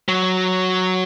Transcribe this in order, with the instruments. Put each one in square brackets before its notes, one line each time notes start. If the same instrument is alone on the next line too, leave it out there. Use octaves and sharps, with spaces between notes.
[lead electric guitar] F#3